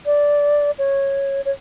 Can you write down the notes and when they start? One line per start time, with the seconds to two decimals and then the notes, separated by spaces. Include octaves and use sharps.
0.06 D5
0.79 C#5
1.45 C#5